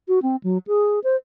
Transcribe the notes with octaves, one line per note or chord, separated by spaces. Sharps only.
F#4
C4
F#3
G#4
C5